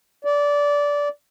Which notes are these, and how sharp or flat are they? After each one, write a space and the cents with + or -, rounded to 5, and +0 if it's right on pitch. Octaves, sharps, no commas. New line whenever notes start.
D5 -20